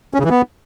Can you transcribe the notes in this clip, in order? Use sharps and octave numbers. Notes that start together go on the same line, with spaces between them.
C#4
C#3
E3
B3